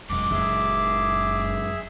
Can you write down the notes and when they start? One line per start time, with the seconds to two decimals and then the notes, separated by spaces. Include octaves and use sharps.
0.10 E1 F#2 G#3 D6
0.31 F#1 G#4 E5